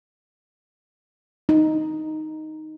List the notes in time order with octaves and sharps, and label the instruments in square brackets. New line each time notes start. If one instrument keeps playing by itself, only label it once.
[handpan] D#4